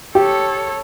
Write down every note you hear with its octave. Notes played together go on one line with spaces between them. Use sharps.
G4 A4 C#5